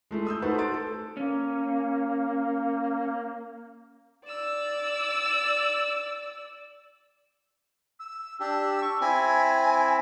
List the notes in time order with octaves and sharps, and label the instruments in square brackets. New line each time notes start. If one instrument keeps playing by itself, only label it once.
[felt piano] G#3 A3 E4
D#6 E6 G6
A3 D#4 F#4 A4 B4 C5
C6 A6 D7
A4
[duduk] A#3 [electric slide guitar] C#4
[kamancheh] D5 E6
[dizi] E6
[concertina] D4 G4 [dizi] E6
[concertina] C#6
[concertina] C4 E4 [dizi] G#5